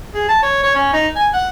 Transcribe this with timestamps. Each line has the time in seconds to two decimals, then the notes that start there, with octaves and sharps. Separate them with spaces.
0.14 G#4
0.29 A5
0.43 C#5
0.63 C#5
0.76 C#4
0.93 D#4
1.16 G#5
1.34 F#5